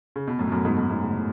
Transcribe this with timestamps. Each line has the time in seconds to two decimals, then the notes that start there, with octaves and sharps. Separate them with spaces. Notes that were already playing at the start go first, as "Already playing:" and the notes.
0.16 C#3
0.27 B2
0.38 F#2 A2
0.48 B2
0.52 F#2 A2
0.65 G#2 B2
0.77 G#2 B2
0.90 G#2 B2
1.03 A2 C#3
1.12 B2
1.17 A2